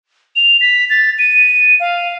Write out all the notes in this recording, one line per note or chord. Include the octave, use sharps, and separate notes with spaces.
F7
B6
A6
D#7
F5